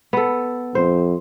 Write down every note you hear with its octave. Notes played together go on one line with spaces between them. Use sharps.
B3 A4
F2 C5